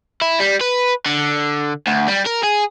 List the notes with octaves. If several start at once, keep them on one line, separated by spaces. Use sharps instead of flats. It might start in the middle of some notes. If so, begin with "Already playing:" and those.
E4
G3
B4
D3
D2
G3
A#4
G#4